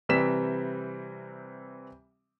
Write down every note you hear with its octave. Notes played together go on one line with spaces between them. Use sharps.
C3 E3 G3 C4 B6 E7